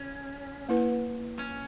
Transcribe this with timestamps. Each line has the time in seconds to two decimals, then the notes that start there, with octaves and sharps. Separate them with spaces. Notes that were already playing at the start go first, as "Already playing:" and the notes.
Already playing: C#4
0.69 A#3 E4 B4
1.39 C#4